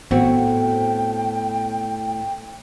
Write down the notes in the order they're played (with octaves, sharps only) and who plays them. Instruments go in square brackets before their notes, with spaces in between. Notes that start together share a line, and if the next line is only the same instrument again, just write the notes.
[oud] A2 C4 F#4 [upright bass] B3 [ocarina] G5